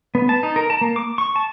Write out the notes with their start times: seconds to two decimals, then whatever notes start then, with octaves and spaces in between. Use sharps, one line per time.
0.15 B3
0.29 A5
0.43 D#4
0.56 A#4
0.70 A5
0.81 A#3
0.96 D6
1.18 C#6
1.36 A5